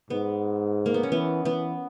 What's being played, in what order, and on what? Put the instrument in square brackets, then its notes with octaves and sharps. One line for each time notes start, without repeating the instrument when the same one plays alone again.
[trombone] G#2 [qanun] B3
[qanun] A#3
B3
C#4
[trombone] E3 [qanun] B3
[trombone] E3 [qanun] B3